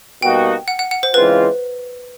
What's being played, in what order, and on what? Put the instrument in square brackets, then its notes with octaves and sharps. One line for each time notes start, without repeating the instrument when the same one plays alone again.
[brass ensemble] B2 G3 A#3 D#4 F#4 [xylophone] G5
[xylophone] F#5
F#5
F#5
C5
[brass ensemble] C#3 E3 G#3 C4 F4 [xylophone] B4